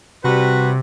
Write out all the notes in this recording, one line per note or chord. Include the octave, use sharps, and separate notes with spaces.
C3 G3 F#4 B4